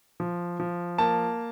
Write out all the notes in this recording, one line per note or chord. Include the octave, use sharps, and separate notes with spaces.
F3
F3
A#3 A5